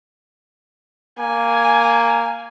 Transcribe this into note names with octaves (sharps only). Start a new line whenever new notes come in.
A#3 G#5